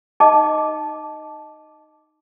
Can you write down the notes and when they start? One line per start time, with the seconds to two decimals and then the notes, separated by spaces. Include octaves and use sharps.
0.20 D#4 D#5 A5 D6